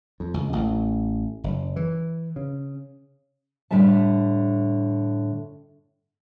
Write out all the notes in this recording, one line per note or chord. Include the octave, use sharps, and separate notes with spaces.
F2
C#2
A1
F#1
E3
C#3
A2 D3 G3 E5 A5